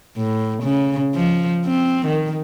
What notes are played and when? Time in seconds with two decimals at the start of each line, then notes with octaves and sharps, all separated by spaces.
0.17 A2
0.63 C#3
1.15 F3
1.66 C4
2.06 D#3